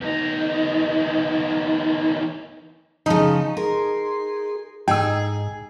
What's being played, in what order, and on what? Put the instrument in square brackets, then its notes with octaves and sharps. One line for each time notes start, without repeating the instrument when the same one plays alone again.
[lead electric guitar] E2 D#4
[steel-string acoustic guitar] C#3 F3 [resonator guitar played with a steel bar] D#4 [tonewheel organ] C#6
[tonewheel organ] G#4 C6 [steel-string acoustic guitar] A#4
[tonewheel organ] G#2 [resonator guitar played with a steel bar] D#4 [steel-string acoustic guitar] G#4 [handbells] G5 E6